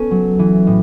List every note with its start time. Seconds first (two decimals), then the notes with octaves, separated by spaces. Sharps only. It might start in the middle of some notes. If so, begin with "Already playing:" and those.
Already playing: B3 C#4 A4
0.11 F#3
0.39 E3
0.67 A2